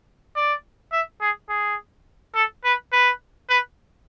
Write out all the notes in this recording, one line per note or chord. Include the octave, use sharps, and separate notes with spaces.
D5
E5
G#4
G#4
A4
B4
B4
B4